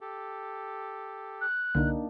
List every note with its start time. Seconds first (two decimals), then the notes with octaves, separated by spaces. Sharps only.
0.01 G4 A4
1.41 F#6
1.75 C2 D3 A#3 D4 D#4